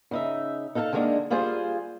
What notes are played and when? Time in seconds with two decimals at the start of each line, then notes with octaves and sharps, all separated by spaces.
0.11 C#3 D#4 E5
0.75 D#4 A4 F5 G5 A5
0.93 D3 D#3 G#3 A#3 D4
1.30 G3 A#3 F4 G#4 C5 G#5